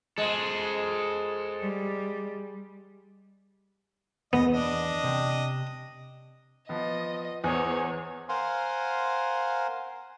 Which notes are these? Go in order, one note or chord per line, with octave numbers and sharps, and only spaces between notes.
G#3 A4 C5
G3
E2 B3 D#5
D4 D#5
C3
F3 B3 D#5
E2 C5 C#5 G#5 D#6
A#4 C5 F5 F#5 G#5 C6